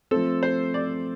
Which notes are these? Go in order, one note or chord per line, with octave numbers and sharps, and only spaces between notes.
F3 A3 C4 A4
C5
D5